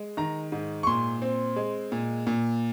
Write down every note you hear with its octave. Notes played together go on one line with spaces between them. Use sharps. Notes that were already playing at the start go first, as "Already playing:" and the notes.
Already playing: G#3
D#3 A#5
G#2
C#6
A#2 C6
C4
G#3
A#2
A#2